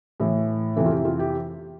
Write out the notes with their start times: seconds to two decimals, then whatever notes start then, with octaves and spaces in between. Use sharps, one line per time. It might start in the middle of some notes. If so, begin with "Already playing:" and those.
0.20 A2 E3
0.77 F2 C3 E3 A4
0.86 F4
0.91 G4
1.05 F4
1.19 G4